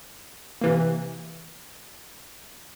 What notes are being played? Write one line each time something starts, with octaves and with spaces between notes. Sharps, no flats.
C3 E3 A#3